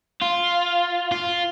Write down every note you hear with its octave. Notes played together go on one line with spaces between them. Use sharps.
F4
F4